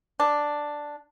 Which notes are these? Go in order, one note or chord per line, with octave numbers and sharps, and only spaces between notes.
D4